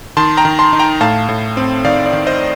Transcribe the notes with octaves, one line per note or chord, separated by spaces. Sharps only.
D#3 A5 C6
G5 A#5
D#3
A5 C6
D#4
G5 A#5
A2 F5 A5
A2
C4
D#3 D5 F5
D5
D#3
C5 D#5